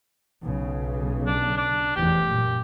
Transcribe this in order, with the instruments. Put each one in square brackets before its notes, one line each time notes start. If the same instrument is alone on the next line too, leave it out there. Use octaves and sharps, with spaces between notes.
[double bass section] B1 C#3
[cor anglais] D4
D4
[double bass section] F1 E2 [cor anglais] G4
[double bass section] F#2 A#2